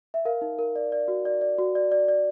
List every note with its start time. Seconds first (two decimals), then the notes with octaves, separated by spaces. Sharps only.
0.14 E5
0.25 A#4 F5
0.42 D#4
0.59 A#4
0.76 D5
0.92 D5
1.08 F#4
1.25 D5
1.41 D5
1.58 F#4
1.75 D5
1.92 D5
2.08 D5